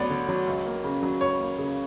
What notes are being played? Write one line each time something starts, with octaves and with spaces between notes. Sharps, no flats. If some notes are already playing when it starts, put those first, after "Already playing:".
Already playing: D2 F#3 B3 D5
D3
F#3
C#2
A#3
C#3
F#3
C#2 C#5
A#3
C#3